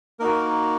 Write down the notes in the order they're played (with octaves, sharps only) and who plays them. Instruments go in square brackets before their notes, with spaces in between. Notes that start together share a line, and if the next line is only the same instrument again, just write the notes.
[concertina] A#3 D#4 F#4 A#4